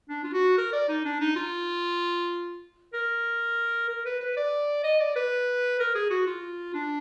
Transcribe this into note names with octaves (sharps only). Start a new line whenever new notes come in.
D4
F4
F#4
A#4
D5
D#4
D4
D#4
F4
A#4
A#4
B4
B4
D5
D#5
D5
B4
A#4
G#4
F#4
F4
D4